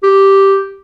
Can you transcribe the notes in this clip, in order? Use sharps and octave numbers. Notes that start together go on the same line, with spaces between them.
G4